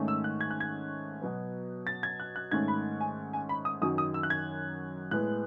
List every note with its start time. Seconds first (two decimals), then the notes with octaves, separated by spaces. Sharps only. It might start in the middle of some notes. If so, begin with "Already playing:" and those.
Already playing: G#2 D#3 A3 C#4
0.08 E6
0.24 F#6
0.41 G#6
0.51 F#6
0.60 G#6
1.22 B2 F#3 B3
1.87 A6
2.03 G#6
2.20 F#6
2.36 F#6
2.51 G#2 D#3 A3 C#4 G#6
2.68 B5
3.01 G#5
3.33 G#5
3.49 B5
3.65 D#6
3.82 F#2 D#3 F#3 C#4 D#6
3.98 D#6
4.14 E6
4.23 F#6
4.30 G#6
5.11 A2 G#3 B3 F#6